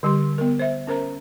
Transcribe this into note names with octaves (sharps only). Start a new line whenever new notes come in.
D3 G3 G4 C6
B3 A#4
C5 E5
C#4 A#4 C5 A#5